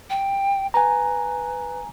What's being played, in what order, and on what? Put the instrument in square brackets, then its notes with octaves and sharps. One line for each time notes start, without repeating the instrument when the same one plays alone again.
[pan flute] G5
[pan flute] B4 [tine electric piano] G#5 A#5